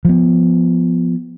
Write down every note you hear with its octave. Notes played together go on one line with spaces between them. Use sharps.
F3 B3